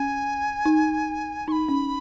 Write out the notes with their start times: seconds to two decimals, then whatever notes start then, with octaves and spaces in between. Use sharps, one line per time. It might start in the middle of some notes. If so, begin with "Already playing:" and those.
Already playing: C#4 G#5
0.65 D#4
1.48 D#4 C#6
1.52 B5
1.69 C#4